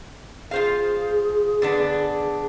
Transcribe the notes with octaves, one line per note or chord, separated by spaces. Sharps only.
F4 G#4 C5 F5
D3 B3 D4